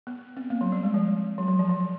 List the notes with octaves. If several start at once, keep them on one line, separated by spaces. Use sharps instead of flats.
B3
C4
A#3
F#3
G3
G#3
F3
F#3
F#3
F3
F#3